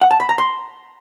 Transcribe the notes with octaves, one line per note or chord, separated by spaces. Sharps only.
F#5
A5
B5
A#5
C6